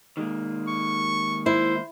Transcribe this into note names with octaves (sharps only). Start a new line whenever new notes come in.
D#3 G#3 A#3
C#6
E4 C5